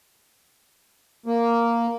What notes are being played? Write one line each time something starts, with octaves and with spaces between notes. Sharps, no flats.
A#3